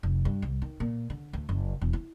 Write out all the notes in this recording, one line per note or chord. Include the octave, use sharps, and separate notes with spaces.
F1
G2
C2
D#3
A#2
D3
D2
F#1
E1
E4